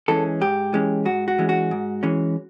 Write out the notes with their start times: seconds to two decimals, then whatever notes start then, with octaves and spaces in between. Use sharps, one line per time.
0.08 E3 G#3 C#4 A4
0.41 G#2 G4
0.73 E3 G#3 C#4
1.05 G#2 F#4
1.28 F#4
1.38 E3 G#3 C#4
1.49 F#4
1.71 G#2
2.03 E3 G#3 C#4